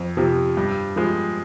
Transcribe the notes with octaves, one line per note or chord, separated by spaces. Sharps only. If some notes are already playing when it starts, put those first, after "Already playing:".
Already playing: F2
C3 F3
G2
F3 G#3